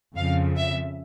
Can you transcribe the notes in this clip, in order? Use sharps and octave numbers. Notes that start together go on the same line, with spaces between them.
F2 C#3 F3 F5
E5